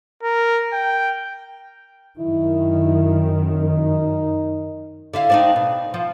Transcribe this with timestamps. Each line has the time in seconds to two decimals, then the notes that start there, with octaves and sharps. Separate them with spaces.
0.23 A#4
0.72 G5
2.20 F#2 D#3 E4
3.59 D#4
5.14 D3 E4 F5
5.30 C4 D4 D#4
5.56 B2
5.94 F3